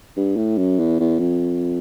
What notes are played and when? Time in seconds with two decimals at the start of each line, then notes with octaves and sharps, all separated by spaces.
0.17 G2
0.37 A2
0.58 F#2
0.79 E2
1.00 E2
1.19 F2